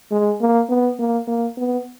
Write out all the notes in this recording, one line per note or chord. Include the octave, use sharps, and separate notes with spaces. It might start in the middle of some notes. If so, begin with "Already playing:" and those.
G#3
A#3
B3
A#3
A#3
B3